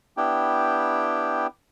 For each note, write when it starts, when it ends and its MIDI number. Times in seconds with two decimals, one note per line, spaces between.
0.17 1.47 59
0.17 1.47 62
0.17 1.47 64
0.17 1.47 67
0.17 1.47 79